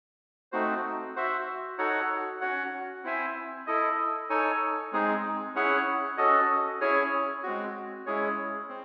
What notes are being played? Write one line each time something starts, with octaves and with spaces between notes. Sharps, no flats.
A3 C4 D#4 F#4 C5
F#4 C5 E5
D#4 F#4 A4 C#5 F#5
C#4 F#4 C#5 F#5
C4 E4 C5 E5 G#5
E4 A4 D#5
D#4 A4 C#5 G#5
G#3 C4 D#4 G#4
C#4 E4 G#4 C#5 F#5
C#4 F#4 A4 D#5
C#4 E4 G#4 C#5 G#5
G#3 C4 F#4
G#3 C#4 E4 G#4 C#5
C4